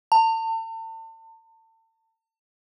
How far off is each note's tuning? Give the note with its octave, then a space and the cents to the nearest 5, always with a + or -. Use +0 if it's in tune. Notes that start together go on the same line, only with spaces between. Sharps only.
A5 +40